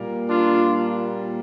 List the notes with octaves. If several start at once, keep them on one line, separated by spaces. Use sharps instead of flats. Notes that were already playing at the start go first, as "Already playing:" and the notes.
Already playing: A#2 G3 A#3
D4 F4